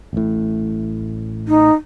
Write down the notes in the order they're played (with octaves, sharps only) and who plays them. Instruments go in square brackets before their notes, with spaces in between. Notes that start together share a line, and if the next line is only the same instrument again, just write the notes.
[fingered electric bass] A1 A2
[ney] D#4